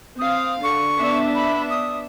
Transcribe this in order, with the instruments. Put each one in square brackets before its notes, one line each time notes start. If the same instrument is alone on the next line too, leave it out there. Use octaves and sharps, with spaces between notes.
[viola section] C4 F5 [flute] D#6
[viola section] D3 [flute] C#6
[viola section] B3 D4 E5
[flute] B5
D#6